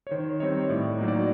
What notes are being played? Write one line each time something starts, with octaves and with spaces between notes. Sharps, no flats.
C#5
D#3 C5
G3 C4 D#4 C#5
A2 D5
F#3 A#3 D#4
D5